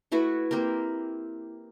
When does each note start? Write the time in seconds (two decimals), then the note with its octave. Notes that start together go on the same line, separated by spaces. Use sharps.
0.12 A3 E4 F#4 B4
0.51 A#3 C4 G4 A#4